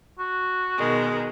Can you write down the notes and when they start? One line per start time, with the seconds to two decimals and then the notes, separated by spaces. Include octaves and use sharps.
0.19 F#4
0.78 B2 D#3 G#3